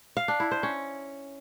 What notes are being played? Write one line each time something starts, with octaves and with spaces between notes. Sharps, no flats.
F5
D4
E4
C5
C#4